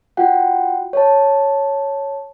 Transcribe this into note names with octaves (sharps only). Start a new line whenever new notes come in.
F4 F#4 F#5 G5
C#5 A5